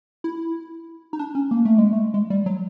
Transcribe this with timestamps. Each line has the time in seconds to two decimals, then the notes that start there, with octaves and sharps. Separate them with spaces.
0.24 E4
1.13 D#4
1.19 D4
1.35 C#4
1.51 A#3
1.65 A3
1.78 G#3
1.93 A3
2.14 G#3
2.30 G3
2.46 F#3